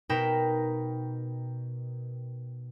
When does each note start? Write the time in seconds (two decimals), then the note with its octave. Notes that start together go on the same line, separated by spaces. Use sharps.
0.09 B2 D#4 A#4 G5 B5 E7